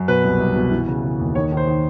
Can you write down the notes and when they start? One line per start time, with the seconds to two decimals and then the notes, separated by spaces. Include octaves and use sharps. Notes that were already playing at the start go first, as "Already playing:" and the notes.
Already playing: F#2
0.08 B2 B4
0.24 C2
0.40 C2
0.56 B2
0.72 E3
0.87 C#3
1.04 C#3
1.20 D#2
1.35 D#3 C#5
1.52 D#3 C5
1.68 D#3